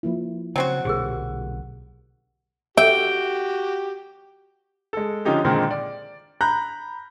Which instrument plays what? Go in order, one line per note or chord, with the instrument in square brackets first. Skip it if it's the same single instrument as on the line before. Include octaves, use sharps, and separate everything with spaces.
[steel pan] F3 A#3 E4
[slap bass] C#3 [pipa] F#3 C4 F#4
[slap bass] B1 A#2 D3 [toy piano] G4 G#4 A#4
[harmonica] F#4 G4 [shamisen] E5 [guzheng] G5
[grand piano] G#3 A4
D3 F3 C#4 D#4 G4
A#2 D3 D#3 G#3 C4
D5
A#5 B5 F#6 G6